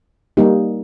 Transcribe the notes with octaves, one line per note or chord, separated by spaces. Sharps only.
G3 A#3 D#4 G4